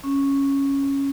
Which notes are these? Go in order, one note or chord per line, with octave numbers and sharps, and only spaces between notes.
C#4